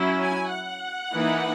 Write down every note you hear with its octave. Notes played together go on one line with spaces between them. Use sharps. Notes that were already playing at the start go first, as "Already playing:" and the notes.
Already playing: F#3 C#4 E4
G#5
F#5
E3 A#3 D#4